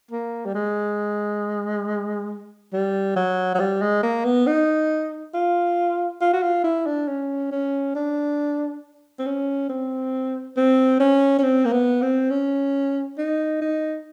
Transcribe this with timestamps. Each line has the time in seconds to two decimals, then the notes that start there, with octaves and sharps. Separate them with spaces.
0.11 A#3
0.45 G3
0.54 G#3
2.72 G3
3.16 F#3
3.55 F#3
3.59 G3
3.81 G#3
4.03 A#3
4.24 B3
4.46 D#4
5.34 F4
6.21 F4
6.33 F#4
6.43 F4
6.64 E4
6.86 D4
7.07 C#4
7.51 C#4
7.95 D4
9.19 C4
9.26 C#4
9.69 C4
10.57 C4
11.00 C#4
11.38 C#4
11.43 C4
11.65 A#3
11.72 B3
12.02 C4
12.30 C#4
13.18 D#4
13.61 D#4